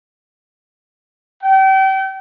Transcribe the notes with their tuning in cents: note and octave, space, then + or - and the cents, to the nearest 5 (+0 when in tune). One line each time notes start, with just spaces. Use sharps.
G5 -35